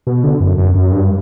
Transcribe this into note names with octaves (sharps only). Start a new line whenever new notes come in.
B2
D3
F#2
F#2
F#2
G2